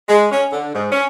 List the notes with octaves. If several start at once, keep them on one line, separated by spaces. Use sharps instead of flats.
G#3
C#4
D3
G#2
C#4